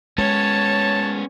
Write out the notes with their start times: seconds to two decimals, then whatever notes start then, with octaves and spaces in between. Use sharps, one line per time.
0.18 G#3 B3 C#4 C#5 A5